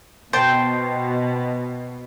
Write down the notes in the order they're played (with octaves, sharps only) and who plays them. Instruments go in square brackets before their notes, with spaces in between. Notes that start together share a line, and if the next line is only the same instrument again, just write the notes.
[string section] B2 [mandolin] C5 G5 A5